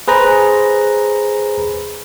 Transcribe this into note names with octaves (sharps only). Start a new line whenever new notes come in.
G#4 B4 C5 A#5